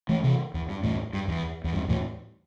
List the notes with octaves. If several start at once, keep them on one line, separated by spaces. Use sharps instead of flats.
E3 A3
C3 E3
E2
G2
E2 A2
G2
E2
E2
G2
E2 A2